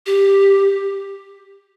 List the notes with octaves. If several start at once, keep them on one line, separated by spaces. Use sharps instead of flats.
G4